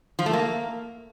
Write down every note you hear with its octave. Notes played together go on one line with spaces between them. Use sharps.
F3
A3
A#3